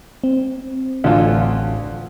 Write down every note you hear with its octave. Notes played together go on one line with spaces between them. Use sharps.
C4
A1 D2 F4 A4 G#5